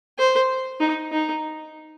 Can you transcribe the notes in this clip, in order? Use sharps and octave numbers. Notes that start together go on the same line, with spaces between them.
C5
D#4
D#4